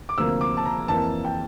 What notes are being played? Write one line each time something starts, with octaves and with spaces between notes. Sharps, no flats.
D6
D2 C3 F3 A#3 E6
D6
A5
A#5
F2 E3 A#3 A5
G5